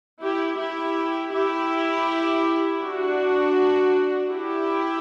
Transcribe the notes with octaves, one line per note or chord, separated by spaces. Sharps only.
E4 G4
E4 G4
E4 G4
D4 F#4
E4 G4